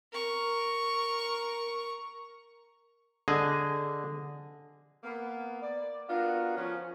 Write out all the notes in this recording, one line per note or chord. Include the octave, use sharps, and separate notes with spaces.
A#4 C#6
D3 G#4 D#5
A#3 B3
D5
B3 D4 F4 F#4 A#4
F3 C#4